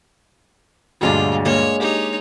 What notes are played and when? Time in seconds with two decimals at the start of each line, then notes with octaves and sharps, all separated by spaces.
1.01 D2 G2 A#2 F#3 G#3 D4 F4
1.46 G#3 A#3 C#5
1.80 D#4 G4 C#5